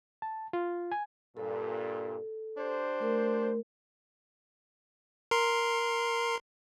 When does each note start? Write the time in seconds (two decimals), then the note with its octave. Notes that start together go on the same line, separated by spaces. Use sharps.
0.22 A5
0.53 F4
0.92 G#5
1.37 G2 A#2 A4
2.58 D4 G4 C5
3.00 A3 A#4
5.31 A#4 C6